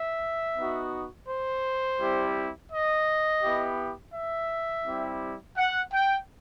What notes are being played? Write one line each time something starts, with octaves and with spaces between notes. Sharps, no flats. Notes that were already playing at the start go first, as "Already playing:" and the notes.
Already playing: E5
B3 D#4 F#4
C5
G3 C4 E4 G4
D#5
B3 E4 G4
E5
G3 C4 E4 G4
F#5
G5